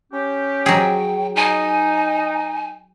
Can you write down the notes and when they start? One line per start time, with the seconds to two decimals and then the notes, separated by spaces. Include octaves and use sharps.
0.13 C#4 G4
0.66 F#3 G#4 G5
1.36 D#4 G#5